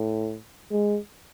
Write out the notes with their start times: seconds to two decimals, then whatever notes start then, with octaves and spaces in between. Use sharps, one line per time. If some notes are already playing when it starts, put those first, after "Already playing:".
Already playing: A2
0.71 G#3